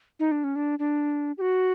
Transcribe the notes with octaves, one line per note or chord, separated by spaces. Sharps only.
D#4
D4
C#4
D4
D4
G4
F#4